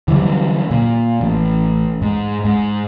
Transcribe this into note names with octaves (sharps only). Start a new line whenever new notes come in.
D3 E3 F#3 G3
A#2
A1
G#2
G#2